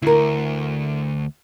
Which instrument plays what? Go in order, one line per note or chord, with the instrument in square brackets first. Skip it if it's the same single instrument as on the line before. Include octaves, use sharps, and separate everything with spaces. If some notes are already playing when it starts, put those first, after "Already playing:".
[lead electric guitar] D2 [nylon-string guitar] E4 A#4